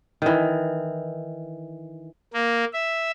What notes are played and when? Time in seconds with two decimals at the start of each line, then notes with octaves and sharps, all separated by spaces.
0.22 D#3 E3
2.34 A#3
2.73 E5